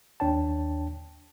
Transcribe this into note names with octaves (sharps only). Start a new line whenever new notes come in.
D#2 D4 C#5 G5 A5